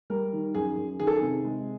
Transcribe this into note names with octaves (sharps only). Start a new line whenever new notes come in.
G3 A#4
D#3
F#2 G#4
F#2
D#3 G#4
A4
G#4
C3
G#3